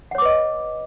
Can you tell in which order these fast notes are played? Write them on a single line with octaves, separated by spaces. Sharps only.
F#5 C#5 D6 B4 D#5